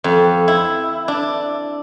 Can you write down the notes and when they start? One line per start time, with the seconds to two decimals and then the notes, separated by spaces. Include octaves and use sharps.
0.04 F2
0.48 E4
1.08 D4